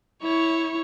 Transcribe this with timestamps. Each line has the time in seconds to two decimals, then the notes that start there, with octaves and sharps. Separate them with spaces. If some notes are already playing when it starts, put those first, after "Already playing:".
0.22 E4 C#5